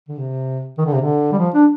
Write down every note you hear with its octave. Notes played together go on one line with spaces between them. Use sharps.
D3
C3
D#3
D3
C3
D3
G3
F3
D4